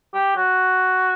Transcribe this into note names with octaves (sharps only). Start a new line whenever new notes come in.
G4
F#4